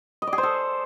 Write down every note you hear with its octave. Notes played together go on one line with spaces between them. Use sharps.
D#5
D5
G#4
C5
A4